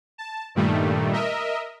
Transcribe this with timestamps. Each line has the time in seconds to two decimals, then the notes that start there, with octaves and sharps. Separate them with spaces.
0.18 A5
0.55 G2 A#2 D#3 G3 A3
1.13 A#4 D#5 E5